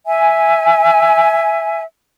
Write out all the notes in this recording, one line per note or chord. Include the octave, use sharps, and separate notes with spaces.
E5 G#5